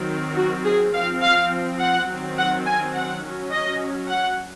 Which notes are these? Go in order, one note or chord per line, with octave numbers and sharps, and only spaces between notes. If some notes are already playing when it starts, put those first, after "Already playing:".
Already playing: D#3 F#3 C4
F#4
G#4
F3 C4 F5
F5
F#5
D#3 F#3 C4
F#5
G#5
F#5
F#3 C#4
D#5
F#5